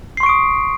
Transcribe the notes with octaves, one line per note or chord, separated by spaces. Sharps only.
C6 C#6 D#6 C7 D7